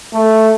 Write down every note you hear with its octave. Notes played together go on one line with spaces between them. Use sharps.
A3